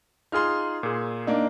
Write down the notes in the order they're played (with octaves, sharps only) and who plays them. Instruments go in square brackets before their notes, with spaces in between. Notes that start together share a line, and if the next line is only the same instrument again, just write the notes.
[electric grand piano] D#4 F4 G#4 [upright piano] C6 F6
[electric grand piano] A#2 G#4
[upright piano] A#3 D4 D#4